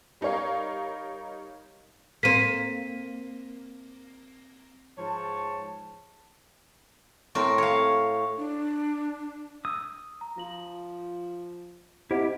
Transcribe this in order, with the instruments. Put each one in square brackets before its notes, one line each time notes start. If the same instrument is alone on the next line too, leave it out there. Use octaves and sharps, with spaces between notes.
[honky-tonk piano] G3 D#4 A#4 C#5 F5
[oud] A#3 C4 [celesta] B6 D#7
[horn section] G#2 F3 C#5 A5
[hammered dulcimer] A2 C#6 [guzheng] C4 A#4
[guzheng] C#5 F5
[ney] D4
[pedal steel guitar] D#6 [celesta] E6
[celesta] A#5
[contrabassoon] F3 [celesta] F4 F#7
[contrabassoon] C3 [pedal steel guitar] E4 G4 [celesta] C5 D#5 F#5